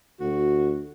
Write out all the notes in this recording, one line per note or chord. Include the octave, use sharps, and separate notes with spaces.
D2 F#4